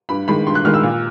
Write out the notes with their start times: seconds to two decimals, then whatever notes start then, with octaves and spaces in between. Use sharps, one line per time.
0.09 G2 B5
0.28 D#3 G#3 B5
0.47 G2 C6
0.55 F#6
0.65 D#3 G#3 F6
0.74 E6
0.83 A#2